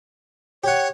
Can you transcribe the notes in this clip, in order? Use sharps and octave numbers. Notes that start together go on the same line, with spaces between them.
G4 C#5 F#5